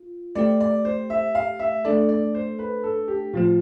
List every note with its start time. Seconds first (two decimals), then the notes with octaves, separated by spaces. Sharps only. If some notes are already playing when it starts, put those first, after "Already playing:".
Already playing: F4
0.35 A3 C4 G4 D5
0.60 D5
0.85 C5
1.10 E5
1.35 F5
1.59 E5
1.85 A3 D4 A4 D5
2.09 D5
2.35 C5
2.59 B4
2.83 A4
3.08 G4
3.34 A2 F3 C4 F4